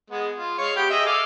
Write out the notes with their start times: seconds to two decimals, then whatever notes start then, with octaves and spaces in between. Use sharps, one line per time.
0.10 G#3 B3
0.38 F4
0.58 G#3 C#5 F5
0.76 B3 G4 G5
0.90 G#4 D#5 E5
1.06 A4 F5 D6